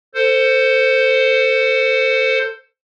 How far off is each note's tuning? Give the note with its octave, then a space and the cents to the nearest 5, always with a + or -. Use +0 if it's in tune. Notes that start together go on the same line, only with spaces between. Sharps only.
A4 +30 C5 +0